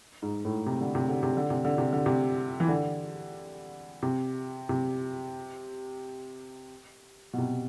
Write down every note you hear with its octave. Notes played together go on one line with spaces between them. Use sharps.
G#2
A2
C3
D3
C3
D3
C3
D3
C3
D3
C3
D3
C3
E3
D3
C3
C3
B2
C3